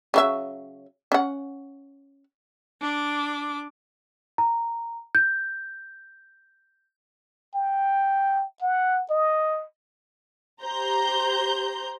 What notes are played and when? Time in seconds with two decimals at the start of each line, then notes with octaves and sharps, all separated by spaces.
0.14 C#3 F#3 E5
1.12 C#4 F#5
2.82 D4 D6
4.38 A#5
5.15 G6
7.54 G5
8.62 F#5
9.10 D#5
10.62 G4 C5 A#5 G6